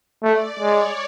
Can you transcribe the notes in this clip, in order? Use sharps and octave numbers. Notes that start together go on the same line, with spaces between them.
A3 D5
G#3 C#5